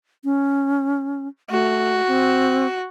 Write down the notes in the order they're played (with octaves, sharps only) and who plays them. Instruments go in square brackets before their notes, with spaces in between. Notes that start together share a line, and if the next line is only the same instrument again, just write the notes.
[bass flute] C#4
[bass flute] A3 [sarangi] F#4
[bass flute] C4